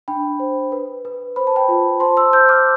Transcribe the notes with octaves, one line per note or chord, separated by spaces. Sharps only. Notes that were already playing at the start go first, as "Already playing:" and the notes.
D4 G5 B5
C5
B4
B4
C5 B5
A5
G5 B5
F4
C5 A5 C6
C6 E6
C5 E6 G6
D6 F6